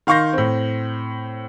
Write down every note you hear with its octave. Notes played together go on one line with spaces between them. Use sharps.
D#3 F5 C6 C#6 G6 A#6
A2 C4